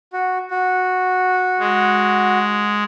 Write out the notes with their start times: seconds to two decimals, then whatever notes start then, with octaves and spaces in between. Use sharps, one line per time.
0.13 F#4
0.51 F#4
1.59 G#3